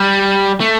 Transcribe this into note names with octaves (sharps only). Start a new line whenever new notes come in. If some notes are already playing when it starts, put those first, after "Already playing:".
Already playing: G3
A3